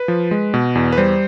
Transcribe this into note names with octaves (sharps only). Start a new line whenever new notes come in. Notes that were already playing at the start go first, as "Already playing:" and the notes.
Already playing: B4
F3
G#3
B2
E2
B4
G3 C5